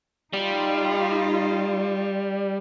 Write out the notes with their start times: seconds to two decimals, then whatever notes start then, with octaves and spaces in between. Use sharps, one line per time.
0.33 G3 D#4 F4